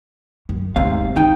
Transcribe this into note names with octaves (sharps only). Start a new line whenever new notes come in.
F#2
G1 D2 G#2 C3 F5
D#3 C4 D#4 G5